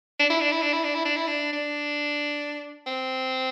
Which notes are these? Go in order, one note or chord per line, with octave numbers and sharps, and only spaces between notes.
D4
E4
D4
E4
D4
E4
D4
E4
D4
E4
D4
D4
C4